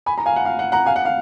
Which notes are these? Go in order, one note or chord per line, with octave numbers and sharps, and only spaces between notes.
G#5 B5
A#5
F5 G#5
F#5
F5
F#5
F#5 A#5
F5 G#5
F#5
F5